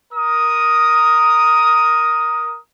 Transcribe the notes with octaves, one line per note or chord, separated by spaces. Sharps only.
A#4 D#6